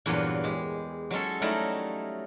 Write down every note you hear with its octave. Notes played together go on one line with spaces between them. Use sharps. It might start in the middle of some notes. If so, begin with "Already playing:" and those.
E2 G2 A#2 F#3
G#3 G4
F#3 G#3 C#4 A4
F#3 G3 A3 D#4 E4 A#4